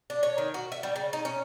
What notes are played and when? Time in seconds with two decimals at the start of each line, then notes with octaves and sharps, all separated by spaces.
0.10 D4
0.23 C#5
0.38 D#3
0.54 F#4
0.72 E5
0.83 G3
0.96 C#3
1.13 D#4
1.25 C#4